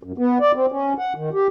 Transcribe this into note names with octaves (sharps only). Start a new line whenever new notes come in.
F#2
B3
D5
C4
C#4
F#5
D#3
G4